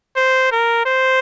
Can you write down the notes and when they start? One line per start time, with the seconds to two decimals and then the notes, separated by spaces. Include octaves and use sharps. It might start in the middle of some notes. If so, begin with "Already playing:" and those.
0.16 C5
0.52 A#4
0.86 C5